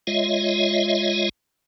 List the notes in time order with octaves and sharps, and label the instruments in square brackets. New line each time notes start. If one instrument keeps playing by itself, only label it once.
[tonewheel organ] G#3 F4 C#5 D#5 E5